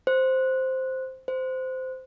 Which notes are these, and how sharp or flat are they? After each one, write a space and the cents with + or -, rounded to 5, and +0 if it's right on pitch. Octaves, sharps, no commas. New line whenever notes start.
C5 +0
C5 -15